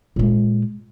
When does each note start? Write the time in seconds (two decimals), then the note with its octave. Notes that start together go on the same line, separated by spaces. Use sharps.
0.16 A#2 G#3